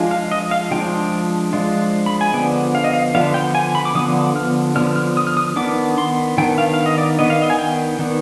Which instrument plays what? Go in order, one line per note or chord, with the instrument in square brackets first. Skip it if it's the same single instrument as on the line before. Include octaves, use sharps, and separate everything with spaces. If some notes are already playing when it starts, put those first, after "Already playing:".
Already playing: [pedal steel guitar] F3 G#3 D4 F4
F5
D#5
F5
F3 G#3 D4 F4 G5
F3 G#3 D4 F4
B5
G#5
D3 F3 B3 D4 G5
F5
D#5
F5
D3 F3 B3 D4 F5
G5
G#5
B5
D6
D3 F3 B3 D4 D#6
F6
D3 F3 B3 D4 F6
F6
D#6
F6
D#6
D#3 B3 D4 D6
C6
D#3 B3 D4 G5
F5
F5
D#5
D5
D#3 B3 D4 D#5
F5
D#5
G#5
G5
D#3 B3 D4